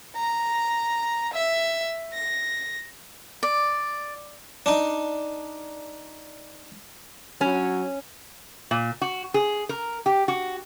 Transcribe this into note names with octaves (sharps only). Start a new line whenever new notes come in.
A#5
E5
A#6
D5
D4 D#4
F#3 C#4
A#2
F#4
G#4
A#4
G4
F#4